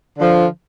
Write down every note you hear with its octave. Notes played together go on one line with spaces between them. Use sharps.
D3 F3